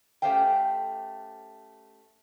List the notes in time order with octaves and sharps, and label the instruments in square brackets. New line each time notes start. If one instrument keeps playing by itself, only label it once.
[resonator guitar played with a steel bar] A3 C#4 G4 C5 F5 G5